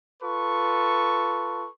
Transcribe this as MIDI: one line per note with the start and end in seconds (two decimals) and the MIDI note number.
0.22 1.68 65
0.22 1.68 69
0.22 1.68 71
0.22 1.68 85